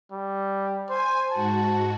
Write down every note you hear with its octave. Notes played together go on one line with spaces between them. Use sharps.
G3
C5 G#5
G#2 F#4 A5